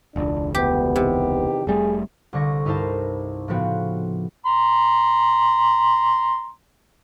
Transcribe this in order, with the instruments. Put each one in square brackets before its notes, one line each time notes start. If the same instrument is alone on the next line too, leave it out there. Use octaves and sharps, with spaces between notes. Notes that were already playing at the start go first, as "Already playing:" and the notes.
[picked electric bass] E1 C#2 [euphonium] D4
[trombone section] D2 [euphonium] B3 [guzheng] G4
[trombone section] E2 D#3 G4 [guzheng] C3
[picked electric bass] F1 G3 A3 [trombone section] G#4
[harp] C2 D3 C#6 A#6
G2 D#4 E4 A#4 C5 A5
A2 C#3 F3 B3 C4 F#4
[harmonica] A#5 C6